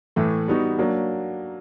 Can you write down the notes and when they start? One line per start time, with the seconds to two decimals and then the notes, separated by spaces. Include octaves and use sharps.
0.16 A2 E3 A3
0.48 G3 B3 D#4 F#4
0.78 F#3 A#3 D4